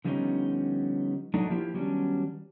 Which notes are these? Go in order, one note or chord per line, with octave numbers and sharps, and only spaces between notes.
D3 F3 G3 B3 C#4 D#4
F#3 A3 D4 D#4
F3 A#3 E4 G4
D#3 F#3 G3 B3 C#4 D4